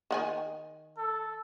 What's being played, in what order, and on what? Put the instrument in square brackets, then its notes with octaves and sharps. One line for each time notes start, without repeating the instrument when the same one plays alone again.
[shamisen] D#3 F#5 G#5
[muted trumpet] A4